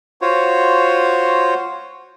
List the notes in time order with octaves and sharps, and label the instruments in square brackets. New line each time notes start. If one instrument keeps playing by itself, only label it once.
[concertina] F4 F#4 C5 C#5